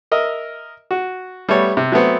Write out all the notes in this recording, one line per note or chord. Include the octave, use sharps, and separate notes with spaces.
A#4 D#5 E5
F#4
G3 A3 B3 C#5
C3
F#3 A3 B3 C4